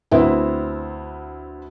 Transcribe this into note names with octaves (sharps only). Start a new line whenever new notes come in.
D2 B3 C4 E4